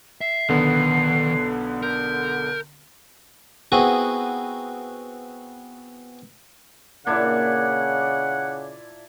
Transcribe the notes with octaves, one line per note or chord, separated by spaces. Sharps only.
E5 C7
B1 D3 D#3 B3
A#4 G6
B3 C4 E4 F#4 G#4 D#5
A#2 C#3 D4 E4 F#5